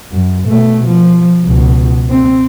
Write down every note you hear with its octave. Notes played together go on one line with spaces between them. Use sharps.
F#2
B2 A3
F3
C#2 B2
C4